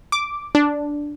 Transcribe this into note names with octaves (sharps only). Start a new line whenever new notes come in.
D6
D4